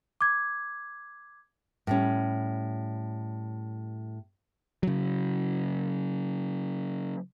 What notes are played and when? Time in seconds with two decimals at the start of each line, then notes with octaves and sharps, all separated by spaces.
0.21 D6 G#6
1.87 A2 G3 C#4
4.83 C#3 F#3